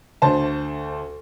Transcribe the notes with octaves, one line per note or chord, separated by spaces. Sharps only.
D2 C5 A5